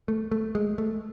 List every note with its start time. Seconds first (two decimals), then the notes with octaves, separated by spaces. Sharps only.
0.08 A3
0.31 A3
0.55 G#3
0.78 A3